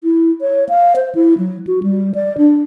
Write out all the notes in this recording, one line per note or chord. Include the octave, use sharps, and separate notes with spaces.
E4
C#5
F5
C5
E4
F#3
F#4
G3
D5
D4